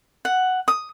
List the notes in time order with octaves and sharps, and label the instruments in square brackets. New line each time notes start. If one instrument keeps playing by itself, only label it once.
[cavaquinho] F#5
D#6